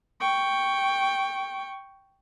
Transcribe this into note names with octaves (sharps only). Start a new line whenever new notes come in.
G5 C#6